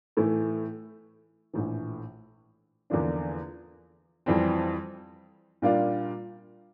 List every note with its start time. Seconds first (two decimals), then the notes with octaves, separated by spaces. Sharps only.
0.17 A2 E3 A3 E4
1.53 A#1 A2 E3
2.90 E2 D3 F3 A#3 D4
4.26 F2 E3 G3 C4
5.62 A#2 G3 A#3 D4 F4